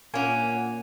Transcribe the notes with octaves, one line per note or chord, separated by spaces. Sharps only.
A#2 A#3 C#4 F#5 G#5